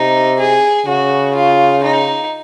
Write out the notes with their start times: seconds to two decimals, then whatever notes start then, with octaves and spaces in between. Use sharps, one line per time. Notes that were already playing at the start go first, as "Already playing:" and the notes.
Already playing: C3 D#4
0.39 G#4
0.86 C#3 F#4
1.35 F4
1.83 D#4